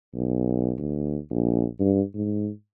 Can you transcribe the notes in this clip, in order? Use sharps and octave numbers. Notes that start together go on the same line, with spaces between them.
B1
D2
A#1
G2
G#2